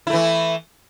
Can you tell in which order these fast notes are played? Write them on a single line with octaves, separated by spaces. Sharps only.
E4 A3 E3